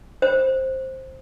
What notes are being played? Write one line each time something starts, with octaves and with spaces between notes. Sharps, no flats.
C5